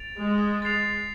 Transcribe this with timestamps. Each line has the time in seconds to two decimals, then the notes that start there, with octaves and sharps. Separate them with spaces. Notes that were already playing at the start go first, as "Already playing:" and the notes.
Already playing: A6 D7 F7
0.18 G#3
0.62 A6 C7 F7